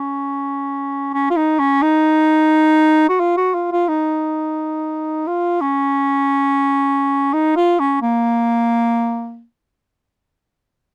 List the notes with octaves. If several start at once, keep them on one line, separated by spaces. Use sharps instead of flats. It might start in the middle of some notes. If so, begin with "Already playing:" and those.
Already playing: C#4
C#4
F4
D#4
C#4
D#4
F#4
F4
F#4
F4
F4
D#4
F4
C#4
D#4
F4
C#4
A#3